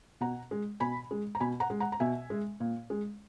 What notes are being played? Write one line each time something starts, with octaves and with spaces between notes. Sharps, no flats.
B2 F#5 A#5
G#3
B2 G#5 B5
G#3
A#5
B2 G#5 B5
F#5 A#5
G#3
F#5 A#5
A#5
B2 E5 G#5
G#3
A#2
G#3